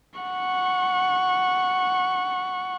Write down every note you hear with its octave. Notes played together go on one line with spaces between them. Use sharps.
F#5 C#6